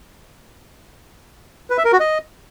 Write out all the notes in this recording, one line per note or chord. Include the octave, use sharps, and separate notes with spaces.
B4
E5
A#4
F#4
D#5